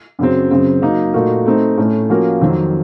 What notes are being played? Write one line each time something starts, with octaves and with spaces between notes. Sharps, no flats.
F#2 C#3 F#3 C4
F#2 C#3 F#3 C4
F#3 A#3 D#4
A#2 A3 D#4 F#4 A#4
A3 C4 D#4
A2 A3 C#4
F3 A#3 C#4 F#4 A#4
F2 D#3 F#3 C4